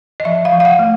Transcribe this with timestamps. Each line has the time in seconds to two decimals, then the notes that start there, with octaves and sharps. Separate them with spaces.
0.20 D#5
0.25 F3 E5
0.45 F5
0.53 F3
0.60 F5
0.65 F#5
0.79 A3